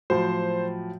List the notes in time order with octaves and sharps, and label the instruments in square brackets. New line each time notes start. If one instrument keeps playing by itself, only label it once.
[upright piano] A2 F3 F#3 [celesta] F#4 [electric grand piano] C5